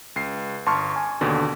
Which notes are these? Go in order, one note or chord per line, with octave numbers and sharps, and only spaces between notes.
C#2 C7
G1 A5 C6 C#6 F6
G#5
D#2 B2 D3